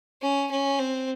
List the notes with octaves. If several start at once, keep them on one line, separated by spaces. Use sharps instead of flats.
C#4
C#4
C4